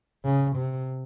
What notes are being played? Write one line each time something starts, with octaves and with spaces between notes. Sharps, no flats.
C#3
C3